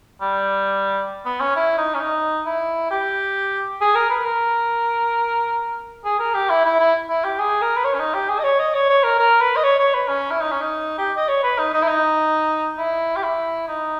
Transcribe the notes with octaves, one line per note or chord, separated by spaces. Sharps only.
G3
B3
C#4
E4
D#4
C#4
D#4
E4
G4
G#4
A#4
B4
A#4
G#4
A#4
G4
E4
E4
E4
E4
G4
G#4
A#4
B4
C#5
C#4
D#4
G4
G#4
D#5
C#5
D#5
C#5
C#5
A#4
A#4
B4
D#5
C#5
C#5
B4
C#4
E4
D#4
C#4
D#4
G4
D#5
C#5
B4
D#4
D#4
E4
D#4
E4
G4
E4
D#4